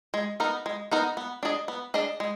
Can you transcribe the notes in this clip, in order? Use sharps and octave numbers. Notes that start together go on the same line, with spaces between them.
G#3
B3 D#4 A#4
G#3
B3 D#4 A#4
B3
D4 G#4 D#5
B3
D4 G#4 D#5
G#3